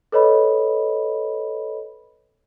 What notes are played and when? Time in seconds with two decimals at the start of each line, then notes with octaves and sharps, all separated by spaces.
0.12 A4 B4 C#5 D#5 B5